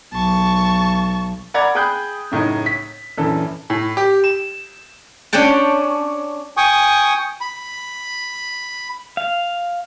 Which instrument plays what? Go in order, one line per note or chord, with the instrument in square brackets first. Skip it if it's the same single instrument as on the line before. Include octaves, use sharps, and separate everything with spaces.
[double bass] B1 [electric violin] A5 C#6
[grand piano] A#4 D5 F#5 A#5 B5 G#6
G#4 G5 B5 D#6 F#6 G6
F#2 A2 C#3 D#4
B6
A#1 F#2 E3 A4
A2
G4
E7
[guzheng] C#4 D4 C#5 G5 A5
[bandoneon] G5 G#5 C#6 D#6
B5
[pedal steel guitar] F5